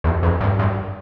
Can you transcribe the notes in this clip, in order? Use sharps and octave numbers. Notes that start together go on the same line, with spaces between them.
E2
F2
G2
G2